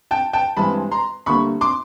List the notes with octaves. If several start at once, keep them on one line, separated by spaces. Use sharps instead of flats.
G5 A5
G5 A5
G2 E3 G#3 C4 A5 B5
A#5 C6
D2 D3 G3 A#3 B5 C#6
C6 D6